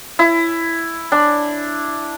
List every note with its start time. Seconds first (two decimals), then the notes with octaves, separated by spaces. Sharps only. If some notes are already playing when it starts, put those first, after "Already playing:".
0.19 E4
1.12 D4